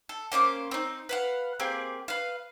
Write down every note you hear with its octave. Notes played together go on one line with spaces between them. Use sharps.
A4
A#3 C#4 C5 D6
C4 D#4
B4 F5 F#5
A#3 C4 G4 G#4
B4 F5